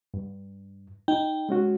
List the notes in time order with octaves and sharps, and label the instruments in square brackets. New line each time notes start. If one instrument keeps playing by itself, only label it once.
[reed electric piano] G2
[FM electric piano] D#4 [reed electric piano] G5
[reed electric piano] G#3 C#4 F#4